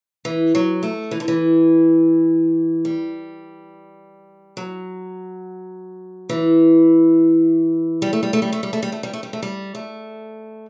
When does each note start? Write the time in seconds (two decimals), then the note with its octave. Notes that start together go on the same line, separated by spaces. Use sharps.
0.25 E3
0.55 F#3
0.83 A3
1.11 E3
1.20 D3
1.28 E3
2.85 G3
4.57 F#3
6.29 E3
8.02 G3
8.13 A3
8.23 G3
8.33 A3
8.42 G3
8.53 A3
8.63 G3
8.73 A3
8.83 G3
8.92 A3
9.03 G3
9.13 A3
9.23 G3
9.33 A3
9.42 G3
9.75 A3